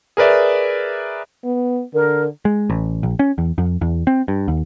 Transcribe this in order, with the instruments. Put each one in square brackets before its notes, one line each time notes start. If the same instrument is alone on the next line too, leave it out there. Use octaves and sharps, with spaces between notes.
[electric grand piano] G#4 A#4 B4 D5 E5
[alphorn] B3
[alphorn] D3 [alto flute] A#4
[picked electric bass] G#3
A1
A#1
C#4
E2
F2
E2
C4
G2
D#2